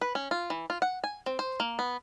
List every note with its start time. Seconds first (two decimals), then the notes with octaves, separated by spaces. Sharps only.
0.01 B4
0.15 C#4
0.31 F4
0.50 E3
0.70 F4
0.82 F#5
1.04 G#5
1.26 C4
1.39 C5
1.60 A#3
1.79 B3